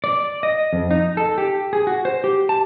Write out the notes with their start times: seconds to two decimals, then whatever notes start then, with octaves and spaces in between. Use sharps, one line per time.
0.04 D5
0.43 D#5
0.73 F2
0.91 D#4
1.17 A4
1.38 G4
1.73 G#4
1.87 F#4
2.05 C5
2.24 G4
2.49 A5